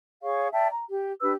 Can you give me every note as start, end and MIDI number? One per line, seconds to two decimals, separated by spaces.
0.23 0.48 68
0.23 0.48 73
0.23 0.48 77
0.23 0.48 85
0.52 0.68 74
0.52 0.68 76
0.52 0.68 79
0.52 0.68 81
0.71 0.84 82
0.89 1.11 67
1.21 1.33 62
1.21 1.33 67
1.21 1.33 71
1.21 1.33 88